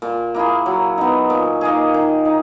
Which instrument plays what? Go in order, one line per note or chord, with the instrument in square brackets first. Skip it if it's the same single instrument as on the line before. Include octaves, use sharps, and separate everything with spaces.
[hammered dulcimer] A#2
A#3 E4 G#4
F#3
B3 D#4
A#2
A#3 D#4 G#4
D#3
D#4